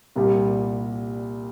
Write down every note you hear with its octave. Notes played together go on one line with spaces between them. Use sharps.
C2 A#2 G3